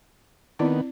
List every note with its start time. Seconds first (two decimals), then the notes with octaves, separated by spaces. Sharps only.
0.59 D#3 B3 C4 E4 D5